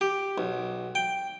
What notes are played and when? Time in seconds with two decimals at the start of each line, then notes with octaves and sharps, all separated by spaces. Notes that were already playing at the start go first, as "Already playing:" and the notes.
0.01 G4
0.38 B1
0.95 G5